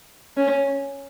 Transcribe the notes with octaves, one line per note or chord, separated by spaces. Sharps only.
C#4